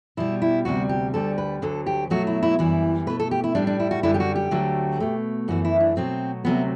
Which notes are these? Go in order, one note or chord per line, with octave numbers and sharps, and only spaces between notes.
B2 G3 E4
E4
D2 C3 G3 F#4
G4
D2 D3 G3 A4
B4
D2 D3 F#3 A4
G4
B2 F#3 A3 F#4
E4
E4
F#2 E3 G3 E4
B2 A3 B4
A4
G4
E4
A2 G3 D4
D4
E4
F#4
F#2 D3 G3 E4
G4
F#4
G4
D2 D3 F#3 A3
B2 A3
F#2 E3 A3 F#4
E4
D4
B2 F#3 A3 C4
D2 C3 F#3 A3 B3